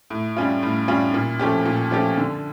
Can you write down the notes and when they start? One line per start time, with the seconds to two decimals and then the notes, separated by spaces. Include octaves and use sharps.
0.10 A2
0.37 G3 C#4 F4
0.63 A2
0.88 G3 C#4 F4
1.14 A#2
1.39 F3 A3 C#4 G4
1.65 A#2
1.91 F3 A3 C#4 G4
2.17 D3